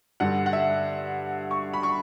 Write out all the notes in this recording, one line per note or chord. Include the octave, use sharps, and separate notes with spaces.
G2 D3 F#5
F#5
E5
C#6
B5
C#6